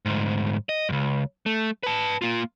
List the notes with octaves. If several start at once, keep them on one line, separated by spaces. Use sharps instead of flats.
D2 G#2
D#5
C#2 F#2
A3
B4 A5
A#3 F4